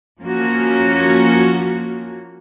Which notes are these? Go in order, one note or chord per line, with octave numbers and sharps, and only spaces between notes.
F3 A#3 C#4 F#4